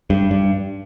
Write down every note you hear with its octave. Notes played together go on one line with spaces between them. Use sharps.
G2
G2